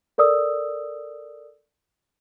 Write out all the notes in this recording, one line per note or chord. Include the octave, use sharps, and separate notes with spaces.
A4 A#4 D5 D#6 E6